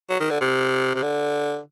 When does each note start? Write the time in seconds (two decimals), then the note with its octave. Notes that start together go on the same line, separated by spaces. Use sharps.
0.09 F#3
0.20 D#3
0.31 D3
0.41 C3
0.95 C3
1.03 D3